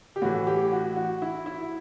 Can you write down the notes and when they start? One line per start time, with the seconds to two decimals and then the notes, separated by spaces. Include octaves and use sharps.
0.16 G4
0.22 A2 E3 F#4
0.47 G4
0.72 F#4
0.96 F#4
1.22 E4
1.46 E4